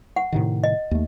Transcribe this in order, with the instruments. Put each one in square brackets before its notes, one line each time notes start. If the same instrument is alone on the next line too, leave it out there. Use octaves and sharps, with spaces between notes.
[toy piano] F#5
[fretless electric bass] A2 C3 D#3
[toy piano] D#5
[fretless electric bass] D#2 A3